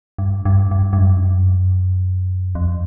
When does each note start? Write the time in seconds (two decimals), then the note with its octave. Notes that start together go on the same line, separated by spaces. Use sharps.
0.18 G2
0.45 G2
0.71 G2
0.93 G2
0.98 F#2
2.55 F2